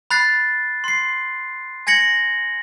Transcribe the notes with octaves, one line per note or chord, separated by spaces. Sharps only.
B5 F#6 A6 C7
C6 C7
G#5 G#6 A#6 C#7 F#7